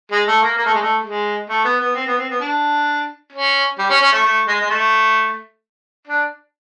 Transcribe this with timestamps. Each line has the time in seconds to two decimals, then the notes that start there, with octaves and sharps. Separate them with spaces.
0.11 G#3
0.27 A3
0.42 A#3
0.57 A#3
0.66 A3
0.74 G#3
0.81 A3
1.03 G#3
1.49 A3
1.65 B3
1.80 B3
1.95 C4
2.07 B3
2.18 C4
2.30 B3
2.40 D4
3.33 C#4
3.79 G3
3.89 C#4
4.01 C#4
4.13 A3
4.24 A3
4.47 G#3
4.61 G#3
4.70 A3
6.07 D4